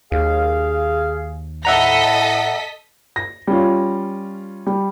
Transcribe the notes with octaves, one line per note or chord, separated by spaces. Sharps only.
D#2 G#4 F5
A2 A4 D#5 E5 F#5 A#5 B6
A#6
G3 C#4 F4
G3